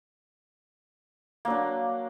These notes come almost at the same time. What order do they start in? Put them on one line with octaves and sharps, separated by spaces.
A#3 F#3 D4